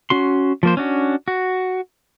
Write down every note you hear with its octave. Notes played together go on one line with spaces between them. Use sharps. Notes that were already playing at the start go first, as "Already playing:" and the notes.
C#4 F#4 C6
F3 A#3 C5
C#4 D4 F#4
F#4